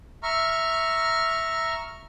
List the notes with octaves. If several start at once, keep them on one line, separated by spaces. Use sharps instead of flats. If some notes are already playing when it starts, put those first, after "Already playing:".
E5 A#5 C#6 F6